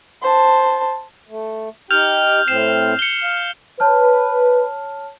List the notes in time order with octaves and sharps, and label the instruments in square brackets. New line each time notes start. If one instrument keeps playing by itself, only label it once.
[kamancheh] C5 A5
[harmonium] A3
[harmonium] D#4 G4 G5 [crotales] F6 G6 F7
[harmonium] A2 C4 [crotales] C7 E7
[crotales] C#7 G7
[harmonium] F5
[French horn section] B4 [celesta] C#5 A5 F6